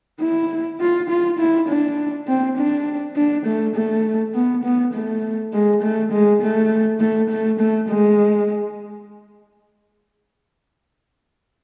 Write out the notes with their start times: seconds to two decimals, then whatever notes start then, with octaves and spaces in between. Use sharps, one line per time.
0.20 E4
0.80 F4
1.09 F4
1.39 E4
1.68 D4
2.27 C4
2.57 D4
3.16 D4
3.46 A3
3.75 A3
4.35 B3
4.64 B3
4.93 A3
5.53 G#3
5.82 A3
6.12 G#3
6.41 A3
7.00 A3
7.30 A3
7.59 A3
7.89 G#3